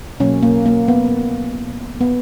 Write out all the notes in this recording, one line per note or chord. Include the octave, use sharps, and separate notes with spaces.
B2 F#3 A#3 C#4
A#3
A#3
B3
B3